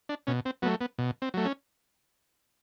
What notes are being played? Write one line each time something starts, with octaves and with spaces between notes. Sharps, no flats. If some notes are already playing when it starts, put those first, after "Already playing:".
D4
B2 C#4
C4
F#3 A3 B3
B3
B2
C4
F#3 A3
C#4